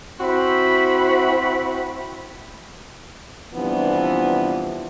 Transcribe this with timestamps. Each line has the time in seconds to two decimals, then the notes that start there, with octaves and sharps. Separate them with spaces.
0.20 C4 E4 F#4 C5 B5
3.54 C3 E3 F3 G3 B3 D4